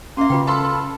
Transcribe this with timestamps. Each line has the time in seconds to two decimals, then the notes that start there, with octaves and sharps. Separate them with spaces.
0.17 A#3 C#4 E5 C6
0.30 C#3 F4 B4 G5
0.47 F4 A4 A#4 A5 B5 C6